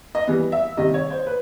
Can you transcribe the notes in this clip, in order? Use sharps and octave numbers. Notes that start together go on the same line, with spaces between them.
D#5
E3 G3 B3
E5
C3 D#3 G3 D#5
C#5
C5
B4